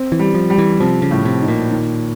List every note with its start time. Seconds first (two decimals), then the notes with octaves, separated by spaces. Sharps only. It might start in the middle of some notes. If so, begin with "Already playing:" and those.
Already playing: C4
0.12 E3
0.19 G3
0.34 F3
0.50 G3
0.58 E3
0.80 C3 F3
1.02 C#3
1.11 A2
1.25 C3
1.41 D#4
1.48 A#2
1.71 D#3